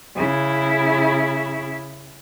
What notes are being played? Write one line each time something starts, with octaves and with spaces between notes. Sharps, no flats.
C#3 E4